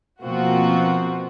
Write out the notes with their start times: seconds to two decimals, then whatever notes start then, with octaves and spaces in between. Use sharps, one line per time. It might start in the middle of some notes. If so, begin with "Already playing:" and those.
0.24 B2 F3 A#3 C4 F4 F#4